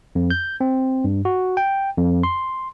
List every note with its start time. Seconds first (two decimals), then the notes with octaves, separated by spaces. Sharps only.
0.15 F2
0.30 G6
0.61 C4
1.04 G2
1.25 F#4
1.57 G5
1.97 F2
2.23 C6